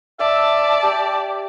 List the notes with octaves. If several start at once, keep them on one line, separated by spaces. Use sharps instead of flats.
D5 E5 A5
G4